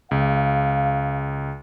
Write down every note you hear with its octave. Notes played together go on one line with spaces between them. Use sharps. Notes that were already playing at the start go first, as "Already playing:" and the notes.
C#2 F5